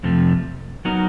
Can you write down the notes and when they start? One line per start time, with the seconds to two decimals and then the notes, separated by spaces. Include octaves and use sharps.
0.03 F2 C3 F3 A3
0.85 F#3 B3 D#4 F#4 A#4